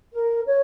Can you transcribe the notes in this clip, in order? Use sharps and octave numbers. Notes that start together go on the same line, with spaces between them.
A#4
C#5